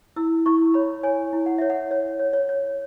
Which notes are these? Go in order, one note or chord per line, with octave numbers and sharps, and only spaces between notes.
E4 E6
E4 C#6
C#5 B5
C#5 G#5
E4
F#5
C#5 E5
F#5
C#5
C#5
C#5
C#5